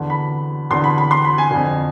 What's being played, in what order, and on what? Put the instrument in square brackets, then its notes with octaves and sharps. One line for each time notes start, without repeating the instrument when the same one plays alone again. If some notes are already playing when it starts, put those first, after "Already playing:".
Already playing: [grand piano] E2 D3
B5
E2 D3 C6
B5
B5
C6
B5
G#5
F2 D3